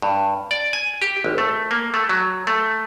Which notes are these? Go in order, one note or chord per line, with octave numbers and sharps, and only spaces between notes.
G2
D5
G#5
G4
G#1
A3
A#3
A3
F#3
A3